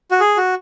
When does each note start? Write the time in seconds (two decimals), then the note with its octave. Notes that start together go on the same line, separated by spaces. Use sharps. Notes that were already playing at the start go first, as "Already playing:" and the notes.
0.11 F#4
0.20 G#4
0.37 F#4